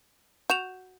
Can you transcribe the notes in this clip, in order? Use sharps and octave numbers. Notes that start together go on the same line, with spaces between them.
F#4 G6 E7 F7